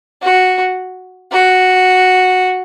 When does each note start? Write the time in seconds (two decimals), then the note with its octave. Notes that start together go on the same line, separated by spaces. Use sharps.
0.22 F#4
1.32 F#4